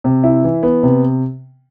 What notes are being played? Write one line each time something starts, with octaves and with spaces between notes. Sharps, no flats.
C3
E4
E3
B3
C3